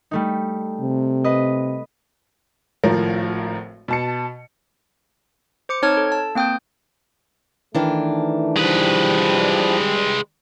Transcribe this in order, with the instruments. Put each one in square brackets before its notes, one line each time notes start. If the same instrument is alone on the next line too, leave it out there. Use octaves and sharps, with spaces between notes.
[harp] G3 A3 D#4
[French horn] C3
[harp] B4 D#5
[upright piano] G#1 A2 F3 A#4
B2 A5 C#7
[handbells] C5 D6 C#7
C4 D#4 C#5 A5 F6 G#6
A4
A5
A#3 C4 G5 D#6 G6
[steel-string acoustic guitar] D#3 E3 D4 [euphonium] A3
[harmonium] F3 [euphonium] G3 [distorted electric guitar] G#3 B4